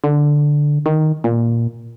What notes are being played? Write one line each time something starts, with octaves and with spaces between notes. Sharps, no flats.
D3
D#3
A#2